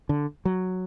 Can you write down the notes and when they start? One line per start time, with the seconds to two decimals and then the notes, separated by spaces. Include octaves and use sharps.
0.09 D3
0.45 F#3